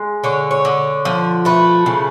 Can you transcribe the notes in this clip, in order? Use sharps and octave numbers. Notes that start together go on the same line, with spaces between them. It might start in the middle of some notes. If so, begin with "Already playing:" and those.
Already playing: G#3
D3 C#5
C#5
D3
F3
A3 B4
C#3